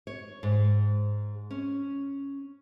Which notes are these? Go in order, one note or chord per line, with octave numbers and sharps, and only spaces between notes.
C#5
G#2
C#4